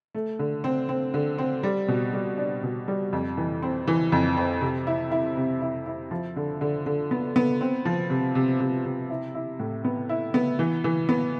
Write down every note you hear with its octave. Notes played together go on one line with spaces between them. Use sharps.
A3
D3
C4
C4
D3
C4
G3
B2
G3
D4
B2
G3
F2
E3
C4
E3
F2
C4
C3
E4
E4
C3
E4
E4
F3
D3
D3
D3
B3
B3
C4
F3
C3
C3
C3
C3
E4
E4
A2
B3
E4
B3
E3
E3
B3